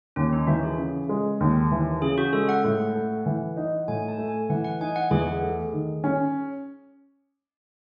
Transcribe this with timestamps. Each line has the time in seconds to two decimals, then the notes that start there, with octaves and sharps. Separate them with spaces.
0.16 D#2 C#4
0.33 D#4
0.47 E3 F#4
0.63 G#4
0.78 C#3
1.09 G#3
1.40 D#2
1.71 E3
2.02 C#3 G#4
2.18 F#4
2.33 G#3 A4
2.49 F#5
2.64 A2
2.95 A3
3.26 E3
3.57 D#4
3.88 A2 G#5
4.08 A5
4.18 A3
4.28 G#5
4.50 E3 F#5
4.64 F#5
4.80 D#4 G#5
4.96 F#5
5.11 E2 G#4
5.43 A3
5.73 D#3
6.04 C#4